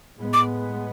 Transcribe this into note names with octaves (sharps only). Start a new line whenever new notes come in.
A2 G#3 B3
D6